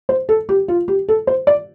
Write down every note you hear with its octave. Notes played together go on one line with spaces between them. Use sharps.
C5
A4
G4
F4
G4
A4
C5
D5